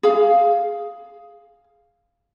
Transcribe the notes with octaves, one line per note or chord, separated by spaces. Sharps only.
G#4 F5